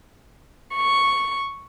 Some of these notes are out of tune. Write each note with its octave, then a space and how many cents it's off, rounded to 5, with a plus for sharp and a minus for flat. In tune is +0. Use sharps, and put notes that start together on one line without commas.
C#6 +0